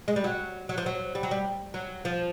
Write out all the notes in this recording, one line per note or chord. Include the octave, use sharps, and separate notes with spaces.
G#3
G3
F#3
F#3
F3
F#3
G3
F#3
G3
F#3
F3